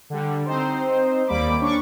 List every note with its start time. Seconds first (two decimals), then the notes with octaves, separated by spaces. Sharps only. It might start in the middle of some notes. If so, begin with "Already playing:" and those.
0.10 D3 G3
0.46 C4 D#4 C5
1.27 D#2 G3 A#3 B5 D6
1.60 C#4 D4 C#6 D6